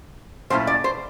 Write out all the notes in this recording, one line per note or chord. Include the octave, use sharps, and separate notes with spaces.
A#2 F#3 A3 C#4 E4 C5
D5
C5